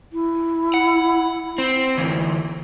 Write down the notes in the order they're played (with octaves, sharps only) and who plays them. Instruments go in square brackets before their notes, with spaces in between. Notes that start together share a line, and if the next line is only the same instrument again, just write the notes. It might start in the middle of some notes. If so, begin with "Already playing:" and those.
[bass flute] E4
[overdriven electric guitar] F#5
C4
D2 E3